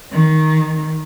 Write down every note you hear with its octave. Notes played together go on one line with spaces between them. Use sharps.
D#3